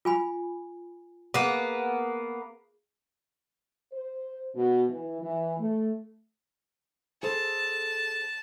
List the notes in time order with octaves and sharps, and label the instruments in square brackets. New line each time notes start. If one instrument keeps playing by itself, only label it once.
[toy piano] F4 G#5 B5
[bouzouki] A#3 B3 [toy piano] G#4
[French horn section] C5
B2
E3
E3
A3
[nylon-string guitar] G#4 A4 C5 [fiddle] A5